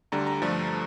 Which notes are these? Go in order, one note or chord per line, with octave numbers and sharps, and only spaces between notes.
D2 D3 G3 A#5
A#5
G2 D3 F3 A3